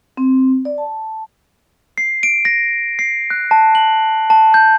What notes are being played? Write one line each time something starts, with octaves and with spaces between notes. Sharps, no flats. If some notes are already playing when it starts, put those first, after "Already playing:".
C4
D5
A5
C7
D7
A#6
C7
F#6
A5
F#7
A5
G6